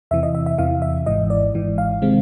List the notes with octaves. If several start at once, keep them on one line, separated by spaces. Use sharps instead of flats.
E2 C3 E3 E5
D#5
E5
E5
E2 C3 E3 F5
E5
G#1 G#2 E3 D#5
D5
G#1 G#2 E3
F5
C3 D#3 G#3 C4